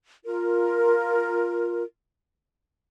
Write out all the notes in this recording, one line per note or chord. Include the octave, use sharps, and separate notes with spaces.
F4 A#4